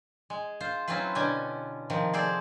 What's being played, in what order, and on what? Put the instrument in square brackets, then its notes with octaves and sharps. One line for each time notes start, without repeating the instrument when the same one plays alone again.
[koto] G#3
F4 C5
F#3 C4 C#4 E4 F4 B4
B2 D3 C#4 G4 G#5
C3 D#3 F3
G#4 A4 C5 D5